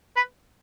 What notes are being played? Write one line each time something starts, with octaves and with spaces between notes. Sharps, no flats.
B4